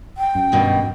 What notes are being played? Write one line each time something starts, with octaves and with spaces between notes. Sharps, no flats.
G5
F#2
G2 B2 D#3